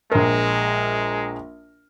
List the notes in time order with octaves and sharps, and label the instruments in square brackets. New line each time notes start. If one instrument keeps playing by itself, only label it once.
[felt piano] A#1 A#4 [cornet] G#3